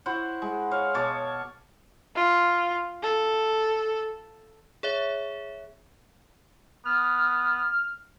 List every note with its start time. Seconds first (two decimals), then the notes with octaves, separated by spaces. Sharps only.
0.06 E4 F#4 C5 F#5
0.42 G#3
0.71 C#5 F5
0.94 B2 C#5 A5 D6
2.15 F4
3.03 A4
4.83 G#4 C#5 E5
6.85 B3 F6